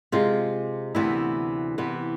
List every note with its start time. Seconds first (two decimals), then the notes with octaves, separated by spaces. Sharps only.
0.12 C3 G#3 C4 F4
0.95 D2 C3 E3 B3 E4
1.78 C3 E3 B3